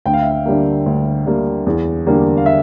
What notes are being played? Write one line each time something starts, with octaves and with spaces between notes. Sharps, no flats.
D2 G5
F5
E5
F5
D3 G3 A#3
D2
D3 G3 A#3
E2
D3 G3 A#3
F5
E5